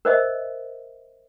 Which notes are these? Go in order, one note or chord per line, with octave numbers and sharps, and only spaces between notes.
A#4 C5 D#5 E5